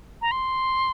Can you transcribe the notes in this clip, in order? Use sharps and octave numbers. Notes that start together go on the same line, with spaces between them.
A#5
C6